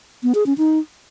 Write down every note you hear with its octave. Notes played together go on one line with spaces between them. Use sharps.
B3
G#4
C#4
D#4